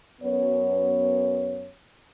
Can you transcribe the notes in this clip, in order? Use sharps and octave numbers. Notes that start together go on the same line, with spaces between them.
F#2 B3 C#5